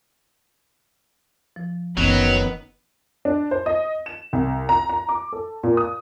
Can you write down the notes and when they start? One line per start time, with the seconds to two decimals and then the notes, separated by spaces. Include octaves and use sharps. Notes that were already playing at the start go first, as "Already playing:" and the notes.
1.56 F3
1.97 F#1 D#3 E3 F#3 B3 C#4 B4
3.25 D4
3.51 C5
3.66 D#5
4.06 E7
4.33 C2
4.69 A#5
4.90 A#5
5.09 D6
5.33 A4
5.63 A#2
5.77 D#6